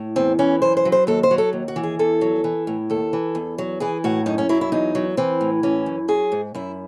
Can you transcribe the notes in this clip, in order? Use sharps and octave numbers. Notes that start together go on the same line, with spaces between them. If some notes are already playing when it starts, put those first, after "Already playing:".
Already playing: A2
E2 C4
E3 C#4
F#2 C5
C5
F#3
C5
D#2 A4
C5
F#3
A4
D#2
F#4
E3
G#4
E2 A4
F#3
E3
A2
D#2 A4
E3
E2
F#3
E3 G#4
A2 F#4
F#2 D#4
C#4
F#3 E4
E4
E2 D#4
F#3
E3 C4
A2
E3 C#4
F#2
F#3 G#4
G#2
F#2 E4